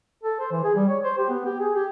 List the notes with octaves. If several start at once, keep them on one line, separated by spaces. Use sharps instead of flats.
A4
C5
E3
G#4
G3
C#5
C5
G4
B3
G4
G#4
G4